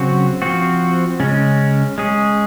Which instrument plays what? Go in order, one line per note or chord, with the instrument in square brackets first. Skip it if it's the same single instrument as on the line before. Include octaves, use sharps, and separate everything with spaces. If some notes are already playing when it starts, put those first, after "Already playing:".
Already playing: [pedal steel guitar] C#3 F#3 C4 F#4
F3 C4 F#4
C#3 G#3 C#4
G#3 C#4 G#4